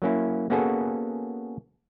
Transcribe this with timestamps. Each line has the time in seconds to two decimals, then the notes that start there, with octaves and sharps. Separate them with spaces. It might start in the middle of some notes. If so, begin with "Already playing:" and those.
0.02 F#3 A#3 C#4 E4
0.50 A#3 B3 C#4 F#4 G#4 A4